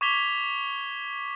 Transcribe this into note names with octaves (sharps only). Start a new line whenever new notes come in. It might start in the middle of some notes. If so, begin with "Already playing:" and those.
C#6 D6 G#6 B6 F7 G7